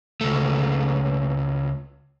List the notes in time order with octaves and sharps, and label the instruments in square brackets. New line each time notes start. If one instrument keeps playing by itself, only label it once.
[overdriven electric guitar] C#2 A3